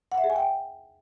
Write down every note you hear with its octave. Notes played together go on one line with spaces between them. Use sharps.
F#5
E5
G#4
G#5
G5